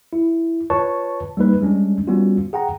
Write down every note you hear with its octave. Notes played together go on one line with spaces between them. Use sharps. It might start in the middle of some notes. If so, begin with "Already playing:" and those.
E4
F4 B4 C#5 A5 C#6
G3 A#3 D#4 B4
G3 G#3 C#4 D4
G3 B3 C#4 F4 F#4
G#4 F#5 G5 A#5